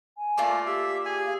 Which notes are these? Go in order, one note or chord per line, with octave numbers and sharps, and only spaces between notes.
G#5
A3 A#3 F4 D5
G4 E5
G#4 G#5